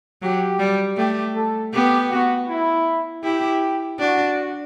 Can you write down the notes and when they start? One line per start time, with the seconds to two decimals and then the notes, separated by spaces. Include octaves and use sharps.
0.22 F#3 G4
0.60 G3
0.97 A3 G4
1.36 A4
1.73 B3 G4
2.10 F#4
2.48 E4
3.24 E4 G4
3.99 D4 F#4